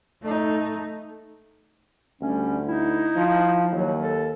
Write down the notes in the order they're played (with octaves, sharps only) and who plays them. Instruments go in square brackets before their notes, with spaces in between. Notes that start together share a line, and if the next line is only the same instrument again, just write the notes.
[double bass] A3 D#4
[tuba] D2 [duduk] G3 [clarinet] C#4
[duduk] D#4 [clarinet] E4
[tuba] F3
[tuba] D#2 [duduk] F#3
[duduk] A4